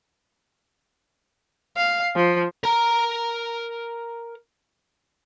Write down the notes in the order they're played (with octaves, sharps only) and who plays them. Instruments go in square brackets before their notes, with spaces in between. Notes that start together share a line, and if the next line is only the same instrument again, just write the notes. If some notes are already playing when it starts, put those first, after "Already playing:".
[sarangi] F5
F3
[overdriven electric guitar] A#4 A#5